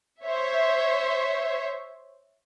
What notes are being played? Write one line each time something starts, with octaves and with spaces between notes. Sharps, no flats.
C5 C#5 E5